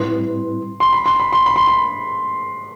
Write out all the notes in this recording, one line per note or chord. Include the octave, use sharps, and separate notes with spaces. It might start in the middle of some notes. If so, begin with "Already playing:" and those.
Already playing: A2 G3 C4 E4 B4 C6
C6
B5
C6
B5
C6
B5
C6
B5